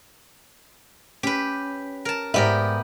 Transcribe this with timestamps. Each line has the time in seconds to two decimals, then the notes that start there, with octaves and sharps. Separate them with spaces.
1.23 C#4 G4 B4
2.05 A#4 A5
2.34 G#2 B3 G4 A#4 D5 E5